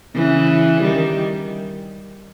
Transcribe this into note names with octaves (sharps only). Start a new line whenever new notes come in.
C#3 E3
D#3 G3